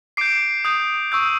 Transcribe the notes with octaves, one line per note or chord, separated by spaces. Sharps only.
D6 G6 C7 D7
D#6 G6
C#6 E6 G6